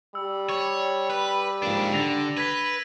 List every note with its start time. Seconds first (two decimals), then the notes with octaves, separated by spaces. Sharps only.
0.15 G3 E6
0.50 C#5
1.10 B4
1.63 G#2 F3 A#3 D4
1.93 D3 D4 A6 A#6 F7
2.38 B4 G#6 B6 G7